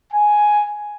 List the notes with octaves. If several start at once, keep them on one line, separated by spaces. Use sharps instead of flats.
G#5